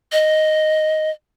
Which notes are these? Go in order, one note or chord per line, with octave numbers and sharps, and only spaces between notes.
D#5